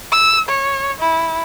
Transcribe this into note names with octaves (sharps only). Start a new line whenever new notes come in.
E6
C#5
E4